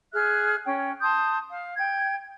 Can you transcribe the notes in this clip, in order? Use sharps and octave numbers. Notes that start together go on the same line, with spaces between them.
G#4 E5 F6 F#6
C#4 C#5 G5
A5 C6 D#6 G6
F5
G5 G#6